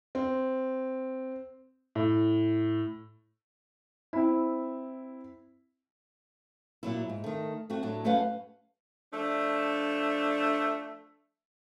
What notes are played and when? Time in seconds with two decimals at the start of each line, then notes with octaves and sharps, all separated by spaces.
0.15 C4
1.95 A2
4.13 C4 E4
6.83 A#2 F#3 E4
7.09 G#2
7.24 D#3 A3
7.70 A3 C4 F#4
7.83 A2 F#3 D4
8.04 F#2 A3 C#4 B4 F5 F#5
9.12 F3 A3 D4